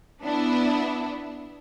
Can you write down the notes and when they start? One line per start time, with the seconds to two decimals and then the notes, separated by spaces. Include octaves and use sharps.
0.22 B3 D4 E4